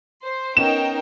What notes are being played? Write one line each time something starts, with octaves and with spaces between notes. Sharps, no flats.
C5
B3 C#4 D#4 A#4 D#5 G5 E7